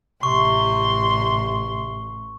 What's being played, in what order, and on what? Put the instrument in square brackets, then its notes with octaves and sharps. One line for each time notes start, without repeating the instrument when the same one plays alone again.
[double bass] A1 [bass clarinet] C3 [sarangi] C6 [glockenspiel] C#6